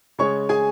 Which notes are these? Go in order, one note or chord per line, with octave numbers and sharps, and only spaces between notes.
C#3 G#3 C#5 C#6
G#4 G#5